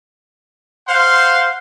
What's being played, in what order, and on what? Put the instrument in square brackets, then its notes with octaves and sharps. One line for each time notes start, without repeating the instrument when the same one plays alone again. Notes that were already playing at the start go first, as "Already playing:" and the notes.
[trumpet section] C5 F5 F#5 C6